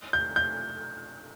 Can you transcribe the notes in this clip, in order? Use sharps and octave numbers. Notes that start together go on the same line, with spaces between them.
G6
G6